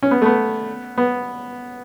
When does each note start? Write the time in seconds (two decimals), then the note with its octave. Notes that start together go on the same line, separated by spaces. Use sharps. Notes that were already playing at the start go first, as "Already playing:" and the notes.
0.03 C#4
0.11 B3
0.22 A3
0.26 B3
0.98 B3